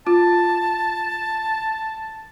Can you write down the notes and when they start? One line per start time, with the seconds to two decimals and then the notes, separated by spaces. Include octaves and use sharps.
0.07 F4 A5